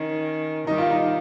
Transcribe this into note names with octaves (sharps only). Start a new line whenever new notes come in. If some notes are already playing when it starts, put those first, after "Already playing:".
Already playing: D#3 C#4
D#3 G3 D#4
F4
D#4